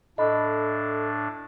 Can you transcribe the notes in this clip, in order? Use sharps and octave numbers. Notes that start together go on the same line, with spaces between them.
A2 D4 A4 D#5 B5